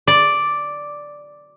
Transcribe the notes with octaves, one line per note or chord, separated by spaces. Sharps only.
D5